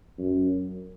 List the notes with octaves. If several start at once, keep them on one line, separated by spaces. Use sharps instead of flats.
F#2